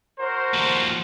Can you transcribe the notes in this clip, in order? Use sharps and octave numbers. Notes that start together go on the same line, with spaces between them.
F#4 A#4 C5
D#2 F3